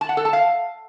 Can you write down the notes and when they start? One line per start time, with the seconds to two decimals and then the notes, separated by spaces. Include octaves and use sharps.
0.01 A5
0.09 F#5
0.17 A4
0.25 A5
0.33 F5